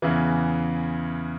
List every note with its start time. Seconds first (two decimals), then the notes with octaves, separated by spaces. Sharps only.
0.02 E2 C#3 E3